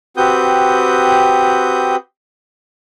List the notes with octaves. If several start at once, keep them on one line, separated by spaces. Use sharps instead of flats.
C4 F#4 G4 B4 D#6 G6